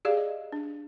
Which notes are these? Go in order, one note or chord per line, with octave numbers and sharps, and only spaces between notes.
G4 G#4 D5 F5
D#5
D4